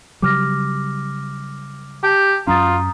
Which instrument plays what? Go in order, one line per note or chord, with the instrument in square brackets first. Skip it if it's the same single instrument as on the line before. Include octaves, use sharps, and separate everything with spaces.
[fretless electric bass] C#3 F#3 G3 [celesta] D6 F6 A#6
[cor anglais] G4 [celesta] A5
[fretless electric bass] F#2 F#3 C#4 [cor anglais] F4 [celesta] A#5 D#6 A6